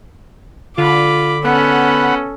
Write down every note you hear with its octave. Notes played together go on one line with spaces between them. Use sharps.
D3 F4 B5 D6
B3 C#4 A4 F#5 B5